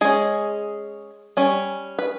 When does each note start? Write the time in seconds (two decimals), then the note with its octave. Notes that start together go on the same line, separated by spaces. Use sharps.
0.01 G#3 C#4 G#4
1.37 G3 C#4
1.99 B4